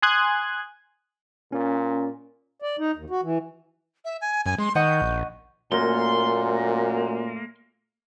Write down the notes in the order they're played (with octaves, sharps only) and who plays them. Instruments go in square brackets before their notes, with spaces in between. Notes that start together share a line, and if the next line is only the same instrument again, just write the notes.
[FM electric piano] G#5 C6 D#6 F#6 G#6
[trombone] A#2 [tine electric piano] C#4
[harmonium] D5
D#4
D#2
F#4
E3
[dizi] E5
G#5
[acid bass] F#2 [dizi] G#5
[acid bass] G#3 [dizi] C6
[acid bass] D#3 [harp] D#5 F#5 C#6 [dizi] G6
[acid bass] A#1
[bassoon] F#2 [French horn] A#2 [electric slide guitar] A3 A#3 [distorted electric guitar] C6